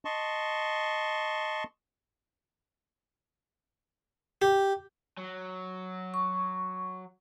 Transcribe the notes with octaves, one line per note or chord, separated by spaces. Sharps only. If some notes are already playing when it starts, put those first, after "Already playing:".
D#5 A5 C6 C#6
G4
F#3
C#6